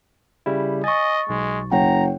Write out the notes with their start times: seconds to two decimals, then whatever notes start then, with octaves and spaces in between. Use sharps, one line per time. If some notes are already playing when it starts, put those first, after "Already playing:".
0.46 C#3 G3 E4
0.84 D#5 G#5 C#6 A6
1.29 B1 G#3
1.71 F#1 C#5 F#5 G5 A#5